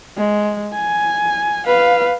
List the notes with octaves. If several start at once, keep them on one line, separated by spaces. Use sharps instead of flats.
G#3
G#5
B4 F5